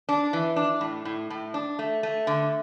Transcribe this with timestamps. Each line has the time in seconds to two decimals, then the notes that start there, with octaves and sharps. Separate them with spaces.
0.09 D4
0.33 E3
0.56 D4
0.81 A2
1.05 A2
1.30 A2
1.54 D4
1.79 A3
2.03 A3
2.27 D3